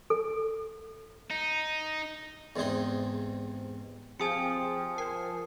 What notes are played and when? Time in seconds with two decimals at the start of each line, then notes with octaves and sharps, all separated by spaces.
0.10 A4
1.31 D#4
2.56 E2 G#2 C3 G#3 D#4 C6
4.20 F3 C4 G4 G#4 G#5 D#6 C#7
4.37 G5
4.98 A#4 C5 G#5 C7